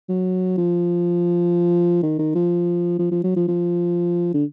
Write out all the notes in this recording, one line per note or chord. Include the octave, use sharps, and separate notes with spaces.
F#3
F3
D#3
D#3
F3
F3
F3
F#3
F3
F3
D3